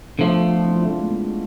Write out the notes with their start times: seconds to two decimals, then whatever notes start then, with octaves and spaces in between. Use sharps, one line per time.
0.18 D3 F3 A3 B3 D4
0.55 F4
0.64 C4 E4
0.76 D4 F4
0.87 G#3
0.99 A3
1.10 G#3 B3